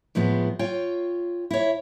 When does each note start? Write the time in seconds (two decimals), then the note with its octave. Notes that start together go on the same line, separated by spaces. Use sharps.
0.15 A2 F3 G#3 B3
0.59 F4 C#5 G5
1.51 E4 C#5